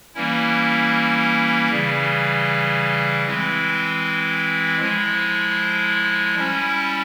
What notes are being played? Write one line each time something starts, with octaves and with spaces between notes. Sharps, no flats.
E3 G3 A#3 C#4 E4
C#3 E3 G3
E3 G#3 C4 E4
F3 G#3 E4
G3 C#4 E4